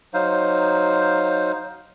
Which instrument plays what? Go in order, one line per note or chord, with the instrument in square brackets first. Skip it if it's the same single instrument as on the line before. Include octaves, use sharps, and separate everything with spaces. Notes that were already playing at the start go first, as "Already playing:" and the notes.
[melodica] F#3 D#4 C5 F5